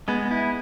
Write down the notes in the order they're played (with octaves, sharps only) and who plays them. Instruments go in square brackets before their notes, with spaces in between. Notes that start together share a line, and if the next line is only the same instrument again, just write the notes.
[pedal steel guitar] G#3 [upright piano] B3
[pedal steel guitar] E4